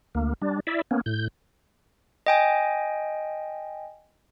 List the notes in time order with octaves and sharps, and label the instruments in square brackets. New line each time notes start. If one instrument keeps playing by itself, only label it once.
[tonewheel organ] D2 A#3
G3 D4
E4 D5 E5
A#3 B3 C#4
A2 G6
[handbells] D#5 G5 G#5